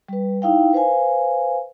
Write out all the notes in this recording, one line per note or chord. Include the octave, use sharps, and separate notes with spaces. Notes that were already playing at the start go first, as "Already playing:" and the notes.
G3 B4
D#4 E4 F5 G5
B4 C5 F5 G#5